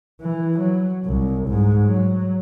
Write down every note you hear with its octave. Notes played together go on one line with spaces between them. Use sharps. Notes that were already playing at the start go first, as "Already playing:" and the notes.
E3
F#3
C2
G#2
F#3